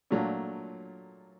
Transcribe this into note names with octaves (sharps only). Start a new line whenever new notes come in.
A#2 F#3 A3 D4 F4